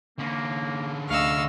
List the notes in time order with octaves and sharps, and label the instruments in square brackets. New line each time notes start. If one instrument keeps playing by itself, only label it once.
[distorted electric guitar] D3 C#4 [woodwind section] A#3
[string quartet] D2 D#5 E6 [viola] F5 [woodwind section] C#6